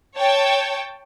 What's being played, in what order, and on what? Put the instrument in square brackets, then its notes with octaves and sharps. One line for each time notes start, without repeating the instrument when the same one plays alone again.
[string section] C#5 G5 A5